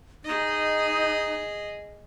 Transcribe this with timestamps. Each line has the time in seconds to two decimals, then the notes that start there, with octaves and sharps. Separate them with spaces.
0.24 D#4 G#4 D#5